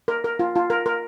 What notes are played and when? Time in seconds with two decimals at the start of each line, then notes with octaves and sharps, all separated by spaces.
0.08 A#4
0.24 A#4
0.39 F4
0.56 F4
0.70 A#4
0.86 A#4